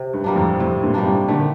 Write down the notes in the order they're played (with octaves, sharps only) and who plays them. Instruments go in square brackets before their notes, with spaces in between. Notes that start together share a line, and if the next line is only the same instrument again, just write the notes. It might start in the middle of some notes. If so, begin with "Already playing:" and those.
Already playing: [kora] C3
[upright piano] G2
[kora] G3 A#3 D4
[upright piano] F2 A2
[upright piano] F2 A2 [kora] C3
[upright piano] G2 A#2
[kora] G3 A#3 D4
[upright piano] A2 C3
[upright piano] A#2 D3 [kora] A3
[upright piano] D#3